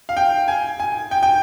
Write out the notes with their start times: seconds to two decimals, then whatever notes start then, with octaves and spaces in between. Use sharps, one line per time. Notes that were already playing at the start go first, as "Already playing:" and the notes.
0.09 F5
0.17 G5
0.48 G#5
0.80 G#5
1.11 G5
1.23 G5